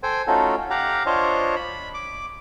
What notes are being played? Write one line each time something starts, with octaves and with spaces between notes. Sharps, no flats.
A4 C5 G5 G#5
A3 C#4 D#4 F4 F#4 A4
G4 F5 F#5 A#5
D4 F4 C5 C#5 D#5
B5
D6